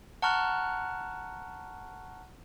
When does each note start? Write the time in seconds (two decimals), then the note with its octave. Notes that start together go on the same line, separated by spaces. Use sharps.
0.22 F#5 A5 A#5 C#6 F6 F#6